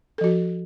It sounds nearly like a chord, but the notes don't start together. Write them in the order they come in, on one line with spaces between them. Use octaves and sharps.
A4 F3 F#4